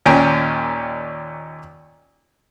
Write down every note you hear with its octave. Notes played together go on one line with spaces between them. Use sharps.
D#2 A#2 C#4 G5